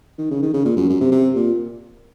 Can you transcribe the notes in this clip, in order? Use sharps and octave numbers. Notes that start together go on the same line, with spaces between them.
D#3
C#3
D#3
C#3
A#2
F#2
F#2
C3
C3
A#2